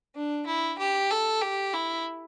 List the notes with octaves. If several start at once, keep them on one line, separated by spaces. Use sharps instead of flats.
D4
E4
G4
A4
G4
E4